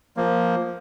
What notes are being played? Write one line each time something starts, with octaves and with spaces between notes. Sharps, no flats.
F3 A#3